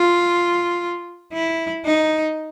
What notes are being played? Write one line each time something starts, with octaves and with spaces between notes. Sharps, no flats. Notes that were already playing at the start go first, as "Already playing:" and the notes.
Already playing: F4
E4
D#4